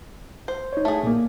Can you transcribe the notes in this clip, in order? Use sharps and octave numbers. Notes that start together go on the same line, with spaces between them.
C5
D#4 C#5
A3 G#4
A#2 A#3